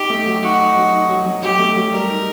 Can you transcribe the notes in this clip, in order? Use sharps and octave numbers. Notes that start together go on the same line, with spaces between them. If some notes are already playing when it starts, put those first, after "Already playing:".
Already playing: D#4 G4
A3
F#3
D#4 F#4
D#4
F#3
D#4
F#3
F#3
F#3 G4
A3
F#3
G3 A#4
D#4